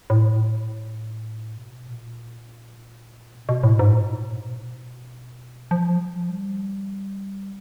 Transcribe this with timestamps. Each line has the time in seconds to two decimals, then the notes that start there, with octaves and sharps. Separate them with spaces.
0.10 A2
1.57 B2
1.87 A#2
3.34 B2
3.49 B2
3.63 A2
3.79 G#2
3.94 A#2
4.23 B2
5.71 F3
5.96 F#3
6.00 F3
6.29 G3